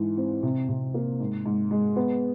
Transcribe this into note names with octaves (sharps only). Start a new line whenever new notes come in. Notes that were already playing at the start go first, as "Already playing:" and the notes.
Already playing: G#2 E3
C4
C3
C3
A#3
G#2
G#2
G#3
B3